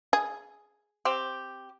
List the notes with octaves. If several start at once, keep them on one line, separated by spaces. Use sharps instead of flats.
G#4
C4 G4